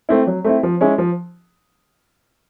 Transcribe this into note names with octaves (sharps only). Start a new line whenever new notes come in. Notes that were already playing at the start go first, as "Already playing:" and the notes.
A3 C4 E4
F#3
A3 C4 E4
F3
G#3 C#4 E4
F3